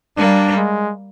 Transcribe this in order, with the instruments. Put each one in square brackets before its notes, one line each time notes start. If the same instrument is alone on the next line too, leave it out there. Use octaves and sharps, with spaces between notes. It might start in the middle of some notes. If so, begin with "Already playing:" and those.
[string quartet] G3 A#3 [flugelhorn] D4
[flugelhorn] G#3